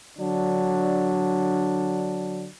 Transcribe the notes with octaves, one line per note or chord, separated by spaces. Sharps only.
D3 F#3 D4